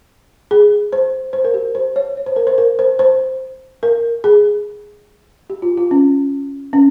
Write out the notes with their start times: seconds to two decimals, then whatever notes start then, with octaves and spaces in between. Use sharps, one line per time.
0.51 G#4
0.93 C5
1.33 C5
1.44 A#4
1.54 G4
1.75 C5
1.96 C#5
2.17 C#5
2.26 C5
2.36 A#4
2.47 C5
2.58 A#4
2.79 C5
2.99 C5
3.83 A#4
4.24 G#4
5.50 G4
5.62 F4
5.77 F4
5.91 C#4
6.73 C#4